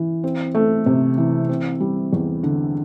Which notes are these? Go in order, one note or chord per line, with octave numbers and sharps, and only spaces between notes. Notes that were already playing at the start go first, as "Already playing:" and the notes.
Already playing: E3
C4
A3
C3
E3
C4
G3
E2
D3